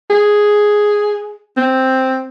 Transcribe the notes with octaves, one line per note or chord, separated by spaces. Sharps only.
G#4
C4